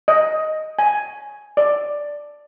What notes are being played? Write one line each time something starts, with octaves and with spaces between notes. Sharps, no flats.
D#5
G#5
D5